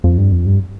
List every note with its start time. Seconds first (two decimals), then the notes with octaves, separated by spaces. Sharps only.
0.04 F2
0.18 G2
0.32 F2
0.46 G2